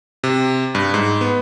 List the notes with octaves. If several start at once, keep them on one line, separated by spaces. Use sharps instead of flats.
C3
G2
G#2
B3